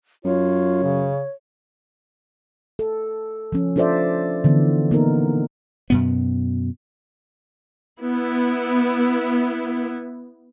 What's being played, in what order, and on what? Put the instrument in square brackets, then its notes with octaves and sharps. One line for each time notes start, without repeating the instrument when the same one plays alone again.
[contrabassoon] F#2 [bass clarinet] F4 [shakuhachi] C#5
[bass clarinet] C#3
[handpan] A4
F3 C#4
D4 F4 A4 C5 D5 E5
D3 E3 B3
A#3 B3 D#4 A#4
[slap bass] F#2 B2 B3
[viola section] B3 E4